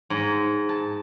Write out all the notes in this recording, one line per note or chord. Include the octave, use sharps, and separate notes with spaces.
G#2
A5